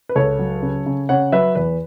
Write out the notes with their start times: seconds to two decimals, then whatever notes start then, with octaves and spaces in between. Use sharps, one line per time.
0.09 B4
0.16 C#2 A4 C#5
0.39 F#3
0.62 C#3
0.86 C#3
1.09 C#3 C#5 F#5
1.32 F#3 B4 E5
1.55 E2 B4